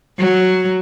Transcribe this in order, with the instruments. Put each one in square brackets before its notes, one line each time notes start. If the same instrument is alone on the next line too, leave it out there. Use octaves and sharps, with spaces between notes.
[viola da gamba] F#3